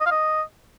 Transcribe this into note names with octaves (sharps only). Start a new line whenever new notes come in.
D#5
F5
D#5